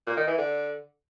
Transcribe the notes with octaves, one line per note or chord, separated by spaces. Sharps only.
A#2
D#3
E3
D3